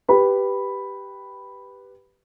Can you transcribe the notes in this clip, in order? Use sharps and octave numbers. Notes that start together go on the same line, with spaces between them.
G4 B4 B5